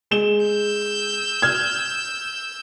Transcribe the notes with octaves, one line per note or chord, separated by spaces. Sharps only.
G#3 E7 G7
E6 G6
F6 G#6